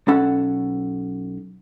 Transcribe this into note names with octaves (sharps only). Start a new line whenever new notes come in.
B1 C#4 A4 F#5